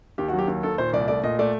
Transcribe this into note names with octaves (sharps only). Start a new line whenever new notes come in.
D#2 G4
F#4
F#3
G4
D#2
D#2 A4
A#2 C5
C2 D5
A3 D5
A#2 D#5
A3 D5